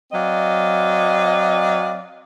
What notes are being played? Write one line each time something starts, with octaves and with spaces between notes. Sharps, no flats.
F#3 C4 D5 D#5 F5